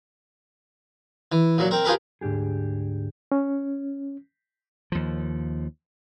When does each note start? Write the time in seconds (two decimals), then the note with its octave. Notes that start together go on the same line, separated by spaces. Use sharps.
1.32 E3
1.58 A#2 F#3
1.71 C4 A#4
1.85 F4 G4 G#4 A#4 B4
2.21 D2 G#2 D4 G4 G#4
3.32 C#4
4.92 D#2 F3